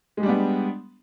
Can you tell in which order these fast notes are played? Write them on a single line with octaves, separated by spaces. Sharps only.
G#3 G4 G3 D4 B3